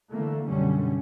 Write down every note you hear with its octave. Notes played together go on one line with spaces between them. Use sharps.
D3 E3 A3 A#3
F#2 B2 D3 G3 C#4